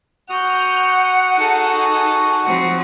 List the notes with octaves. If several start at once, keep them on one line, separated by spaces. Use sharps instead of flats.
F#4 F#5 D#6 F6 G6
D#4 G#4 A4
F3 F#3 C4 F#5